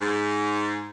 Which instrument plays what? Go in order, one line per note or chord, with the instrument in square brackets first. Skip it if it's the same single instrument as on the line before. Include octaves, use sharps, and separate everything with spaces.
[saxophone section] G#2